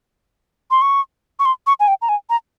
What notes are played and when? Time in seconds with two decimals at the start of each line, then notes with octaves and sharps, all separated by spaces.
0.71 C6
0.82 C#6
1.39 C#6
1.45 C6
1.67 C#6
1.80 G#5
1.88 G5
2.02 A#5
2.09 G#5
2.30 A#5